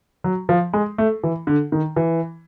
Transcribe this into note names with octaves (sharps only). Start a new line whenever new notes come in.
F#3
F3
G#3
A3
E3
D3
D#3
E3